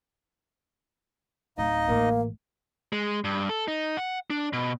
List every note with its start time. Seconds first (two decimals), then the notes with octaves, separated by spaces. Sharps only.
1.58 D1 D#4 D#5 F5
1.89 A1 A#3
2.93 G#3
3.24 G2
3.49 A4
3.68 D#4
3.97 F#5
4.30 D4
4.53 B2